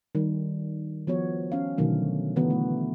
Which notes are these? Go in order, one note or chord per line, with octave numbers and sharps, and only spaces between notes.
D#3 G3
F3 B3 F#4 C#5
C#4 F5
B2 D3 D#3 F#3 A3
D3 E3 B3 F#4
A3